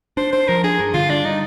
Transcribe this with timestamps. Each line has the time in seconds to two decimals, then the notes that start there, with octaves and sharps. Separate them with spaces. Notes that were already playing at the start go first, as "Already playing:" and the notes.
0.17 D4 C5
0.32 D4 C5
0.48 F3 A#4
0.64 D4 G#4
0.79 G2
0.94 D3 F4
1.09 G3 D4
1.25 D#4